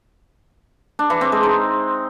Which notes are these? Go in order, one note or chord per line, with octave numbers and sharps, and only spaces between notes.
D4
E3
C4
G#3
D#4